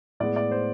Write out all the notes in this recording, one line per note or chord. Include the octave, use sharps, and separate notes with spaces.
A2 G#3 B3 D5
D5
C5